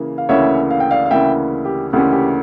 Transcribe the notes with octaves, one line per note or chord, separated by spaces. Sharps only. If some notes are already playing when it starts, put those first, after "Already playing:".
Already playing: C#3 E3 A#3
F5
D2 C#3 E3 A#3 C#4 C#5 E5
F5
G5
D5 F5
F5
D2 C#3 E3 A#3 C#4 E5 G5
G4
D2 C#3 E3 A#3 C#4 G4
G4